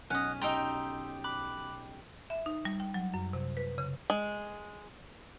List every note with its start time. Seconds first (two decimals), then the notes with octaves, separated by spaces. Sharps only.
0.10 B1 C#4 D#5 F#5 G#5 F6 B6
0.42 D#4 G4 G5 A#5 C6 E6
1.24 B5 D6 F#6
2.30 E5
2.46 D#4
2.65 G3
2.80 G5
2.94 F#3
3.14 F#2
3.33 C3
3.57 B4
3.78 C#3
4.10 G#3